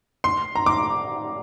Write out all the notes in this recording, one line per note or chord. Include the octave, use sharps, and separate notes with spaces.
C6
A#5
D6